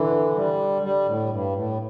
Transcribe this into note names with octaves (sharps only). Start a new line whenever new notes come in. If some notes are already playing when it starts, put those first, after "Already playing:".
Already playing: D3 E3
G3
G3
A2
G2
A2